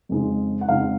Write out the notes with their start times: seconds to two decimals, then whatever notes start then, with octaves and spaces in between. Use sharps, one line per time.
0.09 F2 C#3 G#3 C4 D#4
0.61 F#5
0.69 F2 C#3 G#3 C4 D#4 F5